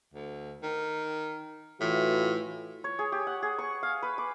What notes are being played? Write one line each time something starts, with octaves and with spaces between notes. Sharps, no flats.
D2
D#3
A2 E3 F4 F#4
C#5
G#4
G4
F#5
G#4
C#6
F5
B4
D6